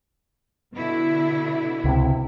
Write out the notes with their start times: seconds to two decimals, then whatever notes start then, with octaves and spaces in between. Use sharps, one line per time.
0.74 B2 D3 E4
1.84 C#2 C3